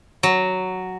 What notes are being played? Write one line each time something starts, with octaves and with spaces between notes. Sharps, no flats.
F#3